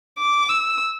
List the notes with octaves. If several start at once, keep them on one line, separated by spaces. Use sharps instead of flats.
D6
E6